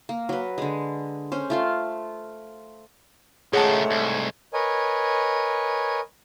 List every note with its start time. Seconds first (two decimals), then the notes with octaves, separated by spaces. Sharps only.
0.09 A#3
0.29 F#3 B4
0.58 D3 G#3
1.32 C#4 C5
1.50 A3 F4 C6
3.53 C#2 G#2 D#3 A3 G#4 C#5 F#5 A5
3.91 C2 G#6
4.53 A#4 B4 C#5 D#5 G#5